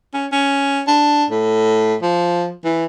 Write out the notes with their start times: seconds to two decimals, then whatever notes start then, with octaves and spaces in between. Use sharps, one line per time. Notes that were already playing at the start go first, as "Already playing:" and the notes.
0.14 C#4
0.32 C#4
0.88 D4
1.30 A2
2.02 F3
2.64 E3